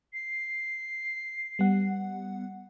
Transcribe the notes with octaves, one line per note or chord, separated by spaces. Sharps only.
C7
G3 B3 F#5